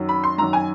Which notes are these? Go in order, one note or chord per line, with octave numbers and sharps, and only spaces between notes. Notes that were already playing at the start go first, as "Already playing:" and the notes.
Already playing: F#2 D#3 F#3
B5
C6
F#2 D#3 F#3 A#5
G#5